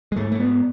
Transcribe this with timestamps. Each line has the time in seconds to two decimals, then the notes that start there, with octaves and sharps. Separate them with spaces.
0.12 G#3
0.17 G#2 A3
0.32 A3
0.40 B3